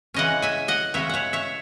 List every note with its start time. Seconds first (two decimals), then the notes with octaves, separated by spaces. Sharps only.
0.14 C#3 E3 G#3 C#4 D#5 F#5
0.42 E5 G#5
0.68 D#5 F#5
0.94 C#3 E3 G#3 C#4 C#5 E5
1.09 C#5 E5 F#5
1.33 C#5 E5